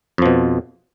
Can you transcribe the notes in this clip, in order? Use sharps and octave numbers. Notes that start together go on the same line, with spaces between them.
F2 B2 F3